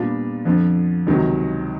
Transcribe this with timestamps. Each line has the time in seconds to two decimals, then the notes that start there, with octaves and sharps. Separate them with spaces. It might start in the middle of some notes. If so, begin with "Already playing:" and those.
Already playing: A#2 G3 B3 D4 F4
0.45 F2 D3 F3
1.07 C#2 C3 D#3 F#3